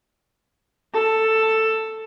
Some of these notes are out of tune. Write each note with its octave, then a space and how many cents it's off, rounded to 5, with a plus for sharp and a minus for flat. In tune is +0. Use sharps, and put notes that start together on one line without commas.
A4 +10